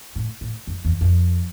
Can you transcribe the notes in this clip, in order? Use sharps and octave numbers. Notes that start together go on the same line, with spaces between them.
A2
A2
F2
E2
F2